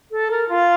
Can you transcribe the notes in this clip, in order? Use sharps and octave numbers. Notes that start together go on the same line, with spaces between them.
A4
A#4
F4